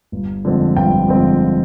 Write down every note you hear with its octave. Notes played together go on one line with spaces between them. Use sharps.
G1
F2 D3 G#3 C4
G1 G5
F2 D3 G#3 C4